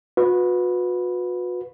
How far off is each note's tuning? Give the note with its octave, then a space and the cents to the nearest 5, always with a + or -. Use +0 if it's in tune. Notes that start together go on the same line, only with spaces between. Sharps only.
F#4 -40 B4 +0